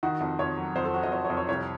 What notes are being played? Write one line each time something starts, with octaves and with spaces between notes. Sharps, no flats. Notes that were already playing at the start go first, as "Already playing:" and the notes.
D#3 F#4
F2
F2 C#5
F#3
F2 C5
A4
F#3 F#4
D#5
F2 C#5
C#5
F2
C#5
C2 C#5